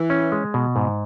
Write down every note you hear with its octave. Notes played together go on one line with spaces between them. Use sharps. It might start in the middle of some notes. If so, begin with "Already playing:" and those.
Already playing: E3
C#4
G#3
B2
G#2